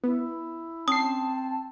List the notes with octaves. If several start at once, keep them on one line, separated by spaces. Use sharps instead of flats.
B3 E4
C4 C#4 A5 D#6 C7